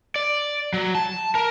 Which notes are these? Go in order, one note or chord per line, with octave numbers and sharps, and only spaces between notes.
D5
F#3
A5
A#4